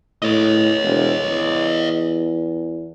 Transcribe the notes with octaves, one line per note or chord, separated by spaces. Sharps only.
A2 C#5 D#5
E1
E2